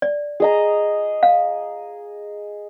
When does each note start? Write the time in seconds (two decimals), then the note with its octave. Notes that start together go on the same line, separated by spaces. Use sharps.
0.02 D5
0.40 G#4 D#5 A#5
1.23 F5